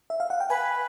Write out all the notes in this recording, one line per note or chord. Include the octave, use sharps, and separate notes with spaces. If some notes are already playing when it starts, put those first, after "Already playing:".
E5
F5
F#5
G5
B4 G#5